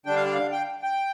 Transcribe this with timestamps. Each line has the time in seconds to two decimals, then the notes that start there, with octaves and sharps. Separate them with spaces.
0.06 D3 G3 D4 G5
0.16 F5
0.25 D5
0.34 F5
0.52 G5
0.83 G5